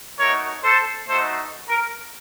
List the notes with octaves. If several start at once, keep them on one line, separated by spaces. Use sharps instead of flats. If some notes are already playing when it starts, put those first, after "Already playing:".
A3 D#4 F#4 A#4 C#5
A4 C5
A3 D#4 F#4 A4 C5
A#4